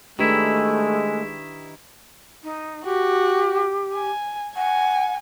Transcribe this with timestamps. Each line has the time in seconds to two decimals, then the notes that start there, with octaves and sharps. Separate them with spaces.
0.19 D#3 G#3 A3 D4 E4 G4 B4
2.43 D#4
2.85 F#4 G4
3.94 G#5
4.56 F#5 G#5